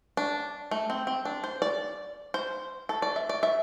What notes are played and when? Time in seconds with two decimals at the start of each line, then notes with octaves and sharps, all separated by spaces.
0.17 D4
0.71 A3
0.90 C4
1.07 C4
1.25 D4
1.44 C5
1.62 D5
2.34 C5
2.89 A4
3.02 D5
3.16 E5
3.29 D5
3.43 E5